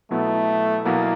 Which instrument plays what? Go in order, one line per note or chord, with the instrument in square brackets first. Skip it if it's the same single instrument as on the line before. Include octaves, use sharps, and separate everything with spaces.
[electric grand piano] B2 F#3 B3 E4 [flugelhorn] A3
[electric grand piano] B2 F#3 B3 E4 [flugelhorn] A#3